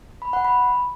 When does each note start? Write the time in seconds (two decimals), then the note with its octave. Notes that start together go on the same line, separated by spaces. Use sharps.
0.22 B5
0.33 F#5
0.45 B5